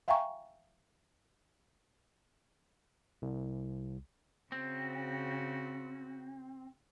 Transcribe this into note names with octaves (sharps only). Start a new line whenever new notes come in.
E5 F5 G5 G#5 A#5 C#6
C2
C#3 C4 F#4